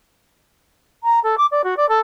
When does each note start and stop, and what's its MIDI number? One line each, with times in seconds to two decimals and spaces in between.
1.03 1.19 82
1.23 1.35 69
1.37 1.46 86
1.51 1.61 74
1.64 1.74 66
1.76 1.88 74
1.89 1.99 69